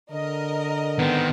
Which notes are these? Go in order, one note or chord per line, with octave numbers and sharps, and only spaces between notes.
D3 A#4 D#5
D#3 B3 C4